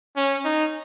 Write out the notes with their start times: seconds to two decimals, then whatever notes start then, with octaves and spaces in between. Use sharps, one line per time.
0.16 C#4
0.45 D#4